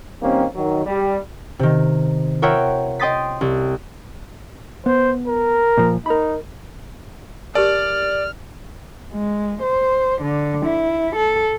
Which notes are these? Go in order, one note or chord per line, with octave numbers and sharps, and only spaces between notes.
D#3 G3 A#3 C4 C#4
D#3 F#3
G3
C3 D#3
F4 A#4 C#5 E5 F#5 G5
D#5 G5 C6 D#6 A6 B6
C2
B3 C5
A#4
A#2 F3
D#4 A#4 B5
G4 A#4 D5 A5 F6
G#3
C5
D3
E4
A4